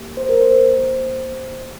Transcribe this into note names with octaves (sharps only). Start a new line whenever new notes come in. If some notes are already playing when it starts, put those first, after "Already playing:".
Already playing: A#3 G4
C5
A#4
C5